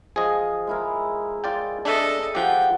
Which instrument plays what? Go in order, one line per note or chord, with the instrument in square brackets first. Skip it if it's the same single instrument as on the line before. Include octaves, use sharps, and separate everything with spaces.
[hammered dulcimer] F3 [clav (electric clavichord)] G#4 D#5
[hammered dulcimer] G#3 E4 A#4
[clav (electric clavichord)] F4 D5 G5
[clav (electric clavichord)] D4 E5 [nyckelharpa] A4 D#5
[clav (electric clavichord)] F3 G4 [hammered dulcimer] D#5 F#5 A5 [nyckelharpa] G5